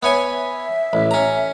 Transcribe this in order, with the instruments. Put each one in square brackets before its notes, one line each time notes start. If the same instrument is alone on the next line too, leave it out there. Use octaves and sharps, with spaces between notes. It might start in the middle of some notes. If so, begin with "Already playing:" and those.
[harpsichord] B3 C#5 G#5 [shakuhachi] E5
[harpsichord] A1
C#4 A#5